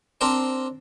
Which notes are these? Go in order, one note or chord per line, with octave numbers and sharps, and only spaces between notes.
C4 D4 A#4 C5